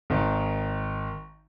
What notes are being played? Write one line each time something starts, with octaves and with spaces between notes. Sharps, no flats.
G#1 D#3